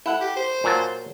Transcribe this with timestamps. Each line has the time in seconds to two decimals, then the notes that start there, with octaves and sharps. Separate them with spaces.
0.06 E4 A4 F#5
0.21 G4
0.36 C5
0.64 A#2 F#3 A5